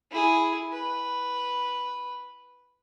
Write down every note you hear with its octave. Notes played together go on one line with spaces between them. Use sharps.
E4 G#4
B4